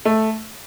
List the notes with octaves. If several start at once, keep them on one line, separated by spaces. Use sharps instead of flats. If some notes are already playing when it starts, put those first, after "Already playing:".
A3